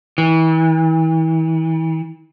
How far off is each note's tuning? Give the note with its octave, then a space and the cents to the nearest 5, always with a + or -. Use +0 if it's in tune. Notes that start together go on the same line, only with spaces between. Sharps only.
E3 -35